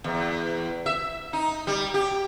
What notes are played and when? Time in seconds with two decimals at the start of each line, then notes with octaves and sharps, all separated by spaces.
0.04 E2
0.86 E5
1.33 D#4
1.67 G3
1.94 G4